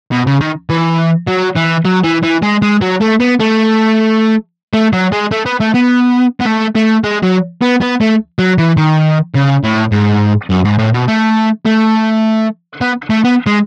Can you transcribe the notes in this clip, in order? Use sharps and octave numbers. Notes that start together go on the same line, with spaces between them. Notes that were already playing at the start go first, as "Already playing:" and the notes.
B2
C#3
D#3
E3
F#3
E3
F#3
E3
E3
G#3
G#3
F#3
A3
B3
A3
A3
F#3
G#3
A3
B3
A3
B3
B3
A3
A3
G#3
F#3
B3
B3
A3
F#3
E3
D#3
C#3
A2
G#2
F#2
G#2
A2
B2
A3
A3
B3
A3
B3
G#3